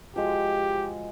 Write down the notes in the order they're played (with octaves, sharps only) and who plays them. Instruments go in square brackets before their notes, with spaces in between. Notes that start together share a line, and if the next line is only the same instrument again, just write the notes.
[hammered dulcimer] F3 G#3 F#4 [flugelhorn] G4